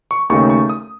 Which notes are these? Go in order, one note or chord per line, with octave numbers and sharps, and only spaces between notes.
C#6
D#2 C#3 A3 D#4 C#6
C#6
D#6